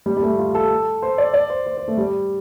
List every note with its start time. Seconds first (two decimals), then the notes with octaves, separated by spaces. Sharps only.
0.06 G3
0.17 G3
0.22 A3
0.39 F4
0.55 A4
1.02 C5
1.18 D5
1.34 D5
1.50 C5
1.66 C5
1.77 C5
1.88 A3
1.97 G3